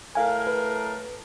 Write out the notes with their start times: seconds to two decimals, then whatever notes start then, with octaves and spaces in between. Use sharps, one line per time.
0.15 A2 A#4 F5 G#5
0.47 B4